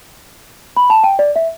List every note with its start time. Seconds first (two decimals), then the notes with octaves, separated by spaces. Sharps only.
0.77 B5
0.90 A5
1.04 G5
1.19 D5
1.36 E5